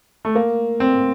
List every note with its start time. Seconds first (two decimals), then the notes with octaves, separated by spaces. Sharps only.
0.25 A3
0.35 A#3
0.80 C4